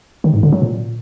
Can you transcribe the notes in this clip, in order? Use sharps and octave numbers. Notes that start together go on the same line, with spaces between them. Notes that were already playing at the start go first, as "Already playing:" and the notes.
D#3
G#2
D3
F#3
A#2